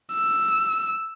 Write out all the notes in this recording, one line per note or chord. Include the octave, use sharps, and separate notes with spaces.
E6